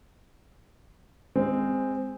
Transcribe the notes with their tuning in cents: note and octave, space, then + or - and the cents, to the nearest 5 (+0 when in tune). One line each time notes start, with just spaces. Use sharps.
G#3 -15 C4 +0